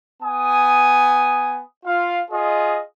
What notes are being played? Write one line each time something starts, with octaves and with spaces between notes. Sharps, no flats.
B3 G#5 D#6
F4 F5
F4 G#4 D#5